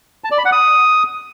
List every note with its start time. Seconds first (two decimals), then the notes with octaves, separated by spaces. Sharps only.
0.24 A5
0.31 D5
0.38 B5
0.45 F#5
0.52 D#6